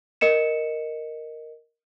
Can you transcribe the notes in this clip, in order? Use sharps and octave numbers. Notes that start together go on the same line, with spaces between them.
A#4 D#5 C#7 E7